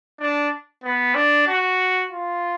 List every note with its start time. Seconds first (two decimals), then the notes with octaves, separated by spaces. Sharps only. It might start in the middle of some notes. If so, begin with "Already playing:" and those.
0.20 D4
0.84 B3
1.15 D4
1.47 F#4
2.12 F4